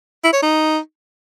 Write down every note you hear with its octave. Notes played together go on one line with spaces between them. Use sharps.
E4
C#5
D#4